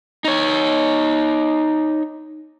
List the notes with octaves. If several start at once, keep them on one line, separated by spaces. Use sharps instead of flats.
D#4 C#5